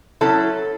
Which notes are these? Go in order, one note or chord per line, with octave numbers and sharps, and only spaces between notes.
F#3 C#4 E4 A4